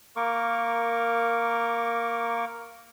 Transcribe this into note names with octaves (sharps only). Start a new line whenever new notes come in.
A#3 A#4 C#6 D6